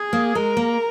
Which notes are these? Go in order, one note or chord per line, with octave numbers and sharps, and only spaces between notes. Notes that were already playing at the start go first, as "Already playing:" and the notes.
Already playing: G#4
A#3
G#3 A#4
A#3